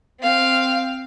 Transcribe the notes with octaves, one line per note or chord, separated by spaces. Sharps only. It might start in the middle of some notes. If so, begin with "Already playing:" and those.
C4 F5